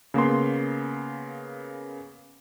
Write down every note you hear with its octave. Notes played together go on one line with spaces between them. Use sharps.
C#3 A#3 B3 C6